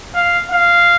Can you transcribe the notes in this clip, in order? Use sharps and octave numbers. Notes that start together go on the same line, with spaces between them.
F5
F5